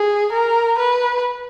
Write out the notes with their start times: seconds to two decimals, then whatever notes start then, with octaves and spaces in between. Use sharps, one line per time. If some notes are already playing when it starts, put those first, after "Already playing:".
Already playing: G#4
0.33 A#4
0.79 B4